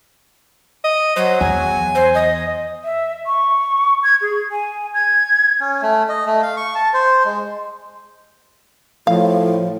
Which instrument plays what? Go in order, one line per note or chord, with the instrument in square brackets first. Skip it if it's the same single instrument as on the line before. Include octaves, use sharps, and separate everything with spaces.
[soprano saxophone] D#5
[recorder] F#3 [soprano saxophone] C5
[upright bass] E2 [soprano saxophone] G#5
[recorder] C5
D#5
[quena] E5
C#6
G#6
G#4
G#5
G#6
[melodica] C#4
A3
D#5
A3
F5
C#6
A5
C5
G#3
[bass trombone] A2 [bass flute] F3 [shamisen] F5